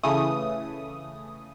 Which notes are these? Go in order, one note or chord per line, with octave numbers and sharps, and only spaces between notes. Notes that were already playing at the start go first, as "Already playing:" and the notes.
C#3 E3 A3 D#6